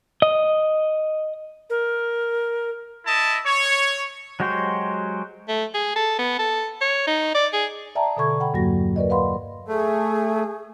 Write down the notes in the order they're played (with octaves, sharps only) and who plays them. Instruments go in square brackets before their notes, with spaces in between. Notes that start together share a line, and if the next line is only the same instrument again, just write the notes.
[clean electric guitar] D#5
[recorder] A#4
[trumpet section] E4 D#5 A5
C#5
[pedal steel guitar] F#3 G#3 F#4 G4 C5
[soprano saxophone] A3
G#4
A4
B3
A4
C#5
D#4
D5
G#4
[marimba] D5 E5 G5 A5 A#5
B2 D3 A4 B5 C#6 G#6
F#5 G5 B5
E2 G2 F#3 A#3 F#4 A#6
A#4 B4 D5 D#5
B4 F5 F#5 B5 C6
[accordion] A3 [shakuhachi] G#4